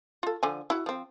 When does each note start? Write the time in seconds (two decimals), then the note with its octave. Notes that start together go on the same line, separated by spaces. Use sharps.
0.23 F4 A4
0.43 D3 F3 G#5
0.70 E4 F#4
0.86 F3 C4